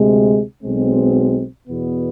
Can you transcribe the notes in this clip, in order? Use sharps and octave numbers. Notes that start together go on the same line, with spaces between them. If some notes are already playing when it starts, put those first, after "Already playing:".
Already playing: D2 C3 G#3
B1 B2 G#3 C4
E2 B2 B3